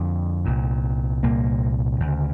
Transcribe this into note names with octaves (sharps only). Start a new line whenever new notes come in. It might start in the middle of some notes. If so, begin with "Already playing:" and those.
Already playing: F2 D3
C2 A#2
C2 A#2 A#3
D2
C#3